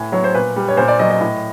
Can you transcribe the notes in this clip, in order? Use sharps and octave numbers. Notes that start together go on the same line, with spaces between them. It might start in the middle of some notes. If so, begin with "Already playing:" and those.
Already playing: A2 G#5
F#3 C#5
C5
A#2 B4
G3
C#5
A#2 C5
D5
F#3 D#5
D#5
A2